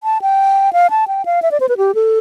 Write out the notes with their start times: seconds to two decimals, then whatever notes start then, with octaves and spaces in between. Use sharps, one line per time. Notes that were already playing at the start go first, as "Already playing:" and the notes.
0.03 A5
0.22 G5
0.73 F5
0.90 A5
1.08 G5
1.25 F5
1.42 E5
1.51 D5
1.60 C5
1.69 B4
1.77 G4
1.95 A4